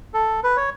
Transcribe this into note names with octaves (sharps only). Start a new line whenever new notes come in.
A4
B4
C#5